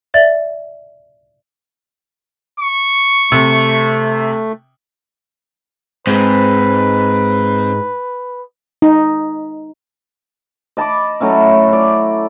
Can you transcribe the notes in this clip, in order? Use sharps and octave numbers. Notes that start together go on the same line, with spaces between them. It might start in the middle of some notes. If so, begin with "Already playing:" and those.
D5 E5 A6
C#6
C3 A3
G#2 C4 B4
D#4
D#5 A5 B5 D6
F#3 A3 C#4 E4
D5